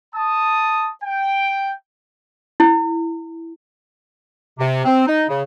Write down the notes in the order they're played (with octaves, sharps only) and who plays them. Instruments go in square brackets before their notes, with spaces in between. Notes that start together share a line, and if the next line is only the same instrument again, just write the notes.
[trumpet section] A5 D#6
G5
[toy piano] E4
[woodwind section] C3
C4
D#4
C#3